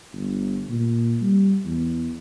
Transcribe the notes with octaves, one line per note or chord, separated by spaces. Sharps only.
G1
A#2
G3
E2